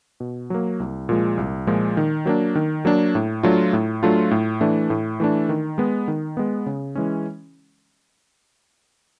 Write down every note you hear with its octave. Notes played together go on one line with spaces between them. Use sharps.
B2
F#3 A#3
C2
A#2 F3 G#3
C2
A#2 F3 G#3
D#3
F#3 A#3 D4
D#3
F#3 A#3 D4
A2
F#3 A3 D4 F4
A2
F#3 A3 D4 F4
A2
E3 A3 D4
A2
E3 A3 D4
D#3
G#3 B3
D#3
G#3 B3
C#3
E3 G#3 C#4